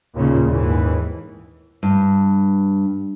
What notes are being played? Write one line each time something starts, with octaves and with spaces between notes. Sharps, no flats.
D#2 A#2 C#3
D#2 G#2 E3
G2